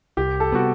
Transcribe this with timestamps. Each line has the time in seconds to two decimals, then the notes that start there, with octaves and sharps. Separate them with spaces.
0.17 C2 G4
0.40 A4
0.52 C3 G3 B3 F#4